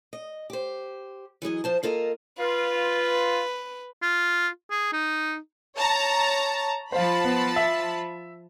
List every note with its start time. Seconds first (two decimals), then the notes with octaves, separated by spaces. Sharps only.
0.13 D#5
0.50 G4 C5
1.42 E3 F#3 G#4 D#5
1.64 F3 C5 A5
1.83 A#3 F4 A4 A#4 D#5
2.39 F4 B4
4.02 F4
4.71 G#4
4.93 D#4
5.77 C#5 A5 A#5
6.92 F3 C5 F5 A5 B5
7.24 B3
7.56 E5